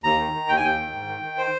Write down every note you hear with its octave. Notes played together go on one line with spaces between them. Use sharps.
D#2 A#5
D#3
D#3
D#2 G5
G#5
D#2 G5
D#3
G#2
D#3
D#3
C5